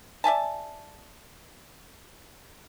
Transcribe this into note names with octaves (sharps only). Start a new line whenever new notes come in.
D5 E5 G#5 A5